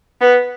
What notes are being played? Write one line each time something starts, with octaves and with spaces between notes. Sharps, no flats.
B3